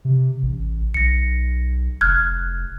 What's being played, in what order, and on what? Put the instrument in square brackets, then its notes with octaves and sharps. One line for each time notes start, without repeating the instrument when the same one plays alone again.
[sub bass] C3
A1
[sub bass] B1 [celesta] A#6 C#7
[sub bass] F1 [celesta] F6 F#6 G#6